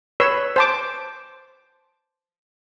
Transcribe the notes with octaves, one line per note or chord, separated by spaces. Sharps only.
B4 C#5 E6
C5 A5 D6